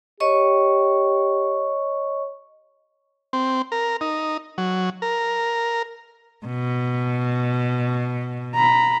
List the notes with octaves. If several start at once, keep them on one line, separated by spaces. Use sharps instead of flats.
G4 C#5 D#5 C#6
C4
A#4
D#4
F#3
A#4
B2
A#5 B5